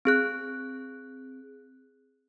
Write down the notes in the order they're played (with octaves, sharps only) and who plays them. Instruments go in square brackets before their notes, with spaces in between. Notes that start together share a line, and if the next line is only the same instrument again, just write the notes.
[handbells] C4 G#4 F#6